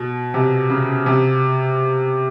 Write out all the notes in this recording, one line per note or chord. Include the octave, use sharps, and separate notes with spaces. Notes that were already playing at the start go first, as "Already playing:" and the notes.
Already playing: B2
C3
C#3
C3